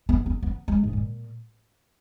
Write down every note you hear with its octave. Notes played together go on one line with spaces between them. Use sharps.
B3
B3
B3
G#3
G#2
A#2